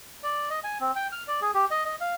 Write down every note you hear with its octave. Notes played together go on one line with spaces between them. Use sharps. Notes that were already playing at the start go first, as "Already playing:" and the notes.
D5
D#5
G#5
C4
G5
F6
D5
G#4
G4
D#5
D#5
F5